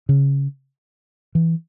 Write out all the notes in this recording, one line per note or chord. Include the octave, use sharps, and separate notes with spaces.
C#3
E3